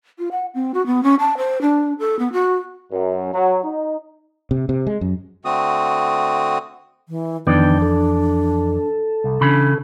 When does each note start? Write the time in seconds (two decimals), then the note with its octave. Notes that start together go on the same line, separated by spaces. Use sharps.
0.19 F4
0.31 F#5
0.55 C4
0.74 F#4
0.86 B3
1.03 C#4
1.19 A5
1.37 C5
1.61 D4
1.99 A4
2.19 B3
2.33 F#4
2.92 F#2
3.33 F#3
3.64 D#4
4.51 C3
4.69 C3
4.87 G#3
5.01 F#2
5.45 D3 A3 C4 F#4 D#6
7.09 E3
7.47 F2 D#3 E3 B3 D4 D5 G5
7.82 A4
9.24 C2
9.41 C#3 E3 D4 B5